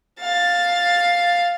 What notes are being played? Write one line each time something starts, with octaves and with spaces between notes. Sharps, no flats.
F5 A6